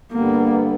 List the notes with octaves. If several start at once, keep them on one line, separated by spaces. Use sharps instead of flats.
G2 D3 G3 A#3 B3